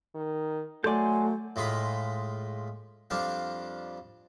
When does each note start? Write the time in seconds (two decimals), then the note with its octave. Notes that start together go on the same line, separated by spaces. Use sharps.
0.15 D#3
0.84 F#3 A3 A4 D5 G#5 C6 G6
1.56 A2 G#3 F4 B5
3.10 F2 G3 D4 F5